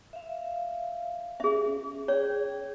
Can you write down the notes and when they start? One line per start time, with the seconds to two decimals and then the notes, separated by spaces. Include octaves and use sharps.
0.13 E5 F5
1.40 C#4 G#4 E5
2.08 G#4 C#5 G5